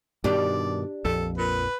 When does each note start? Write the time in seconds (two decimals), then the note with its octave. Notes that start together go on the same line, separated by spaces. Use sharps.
0.24 G2 B2 D#3 D4 G4 D5
1.05 A#1 F2 A4
1.38 A#2 B4